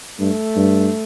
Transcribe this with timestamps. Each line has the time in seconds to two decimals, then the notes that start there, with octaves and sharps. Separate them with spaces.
0.20 G2 A3
0.56 G2